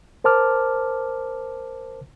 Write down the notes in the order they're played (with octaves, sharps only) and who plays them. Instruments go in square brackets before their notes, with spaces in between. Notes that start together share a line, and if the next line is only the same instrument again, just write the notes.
[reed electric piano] A#4 C5 A5 D6 F6